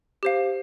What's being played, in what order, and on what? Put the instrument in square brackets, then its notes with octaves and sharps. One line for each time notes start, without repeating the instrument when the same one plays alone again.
[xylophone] G4 C5 F5